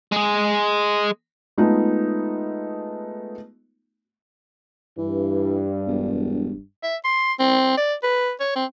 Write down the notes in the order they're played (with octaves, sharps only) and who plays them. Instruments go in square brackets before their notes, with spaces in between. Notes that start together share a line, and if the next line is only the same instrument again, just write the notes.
[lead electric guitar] G#3 G#4
[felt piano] G#3 A3 B3 D#4 F4
[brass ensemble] G2 [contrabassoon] E3
[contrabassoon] E1
[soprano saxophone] E5
C6
C4
D5
B4
C#5
C4